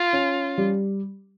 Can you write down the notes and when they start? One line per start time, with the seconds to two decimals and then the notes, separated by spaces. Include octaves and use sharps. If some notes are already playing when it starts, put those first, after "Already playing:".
Already playing: F4
0.13 C#4
0.58 G3